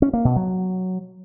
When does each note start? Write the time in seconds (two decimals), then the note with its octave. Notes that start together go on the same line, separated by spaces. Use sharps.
0.02 C#4
0.13 A#3
0.25 B2
0.36 F#3